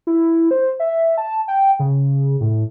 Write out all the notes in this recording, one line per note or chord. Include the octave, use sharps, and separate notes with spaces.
E4
C5
E5
A5
G5
C#3
A2